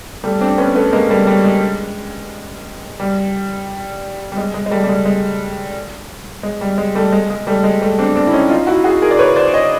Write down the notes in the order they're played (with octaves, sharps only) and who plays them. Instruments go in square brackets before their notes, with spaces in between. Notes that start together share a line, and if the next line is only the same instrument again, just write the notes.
[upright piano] G3 A3
C4 D4
B3 C#4
A3 B3
G#3 A#3
G3 A3
G3
G#3
G3
G3
G#3
G#3
G#3
G3 A3
G3
G#3
G#3
G#3
G3
G#3
G3 A3
G#3
G#3
G3 A3
G#3
G3 A3
C4 D4
C4 D4
E4
C#4 D#4
D#4 F4
E4 F#4
F#4 G#4
G#4 A#4
D5
B4 C#5
C5 D5
C#5 D#5